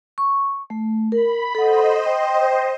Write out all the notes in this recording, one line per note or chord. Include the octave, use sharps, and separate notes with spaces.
C#6
A3
A#4 B5
A4 C5 D#5 F#5
G5